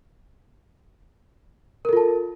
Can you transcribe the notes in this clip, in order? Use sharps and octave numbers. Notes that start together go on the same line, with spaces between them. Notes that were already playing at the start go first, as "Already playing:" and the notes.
F4 A4 A#4 A5